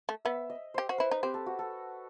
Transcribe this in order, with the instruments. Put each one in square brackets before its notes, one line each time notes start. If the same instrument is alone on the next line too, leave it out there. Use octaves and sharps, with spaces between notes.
[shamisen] A3
[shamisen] B3 [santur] E5
[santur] D#5
[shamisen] G4 [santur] C5
[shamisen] F#4
[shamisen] E4 [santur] B4
[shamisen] D#4
[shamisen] C4 [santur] G4
[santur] A4
F#4
A4